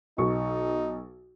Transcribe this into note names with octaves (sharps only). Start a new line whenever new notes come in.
B1 D#4 C#6